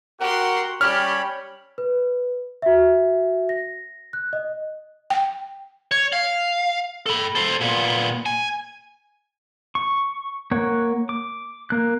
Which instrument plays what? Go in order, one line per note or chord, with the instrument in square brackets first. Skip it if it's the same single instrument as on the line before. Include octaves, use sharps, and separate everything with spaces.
[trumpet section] F#4 F#5 [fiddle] G4 C6 [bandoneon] A#4
[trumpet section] G3 C#4 [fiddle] G4 [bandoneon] C#5 B5 [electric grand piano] F6
[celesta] B4
F#4 E5
A#6
F#6
D#5
[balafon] G5
[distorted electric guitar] C#5
F5
A4 B5
A4 C5
A#2 B3
G#5
[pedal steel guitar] C#6
A#3 C#5 F#5
D6
A#3 F#6